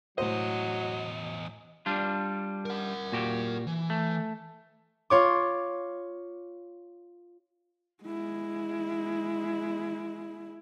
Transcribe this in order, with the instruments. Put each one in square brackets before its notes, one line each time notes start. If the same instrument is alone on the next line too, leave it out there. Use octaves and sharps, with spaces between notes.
[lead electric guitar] E2 D#5 [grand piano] A2 C5 [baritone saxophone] F#3
[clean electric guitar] G3 D4 F4
[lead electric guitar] A#4 F#5
[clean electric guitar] A#2 F#4 G4
[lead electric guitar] E3
[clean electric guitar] A3
[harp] F4 C#5 D6
[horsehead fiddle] G#3 E4